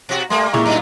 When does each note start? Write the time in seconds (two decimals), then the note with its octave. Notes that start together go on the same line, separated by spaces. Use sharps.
0.09 B2 F#4
0.30 G3 A3 A#3 C6
0.53 A#2 G#3 E4 C#6
0.65 F#2 D#4 F4